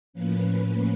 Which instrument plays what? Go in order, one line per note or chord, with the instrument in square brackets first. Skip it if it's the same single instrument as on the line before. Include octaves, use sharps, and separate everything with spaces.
[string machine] A2 F3 A#3 C#4 B4